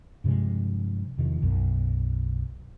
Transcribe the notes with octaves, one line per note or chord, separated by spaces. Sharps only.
G2 C3 F3 G#3
E2 C3 D#3 F3
B1 F#2